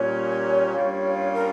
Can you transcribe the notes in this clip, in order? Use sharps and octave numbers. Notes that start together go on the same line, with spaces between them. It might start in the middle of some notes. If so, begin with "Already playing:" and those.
Already playing: A#2 G3 C#4 C#5
G2 G3 A#3 C#4 F4
A#4